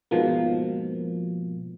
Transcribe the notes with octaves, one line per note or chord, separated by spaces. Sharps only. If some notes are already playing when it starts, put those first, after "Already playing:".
G#2 B2 F3 A#3